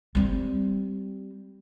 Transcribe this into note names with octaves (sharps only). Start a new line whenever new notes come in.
G3 C4